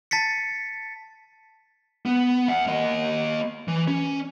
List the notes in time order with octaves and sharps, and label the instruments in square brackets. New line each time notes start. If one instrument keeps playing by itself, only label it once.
[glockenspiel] A5 A6 B6 C#7
[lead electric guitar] B3
E5 F#5
A#3 D#5
E3
C#4